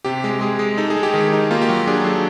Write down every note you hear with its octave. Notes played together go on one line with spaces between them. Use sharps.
C3 G4
G#3
G#3 G#4
G#3
D#4 A4
G#4
G#3
G4
D#3 G#4
D#4
A#3 F4
G4
F#3 F#4
D4 G#4
F#3 A4